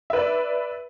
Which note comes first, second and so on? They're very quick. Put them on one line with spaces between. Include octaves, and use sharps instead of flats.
E5 B4 D5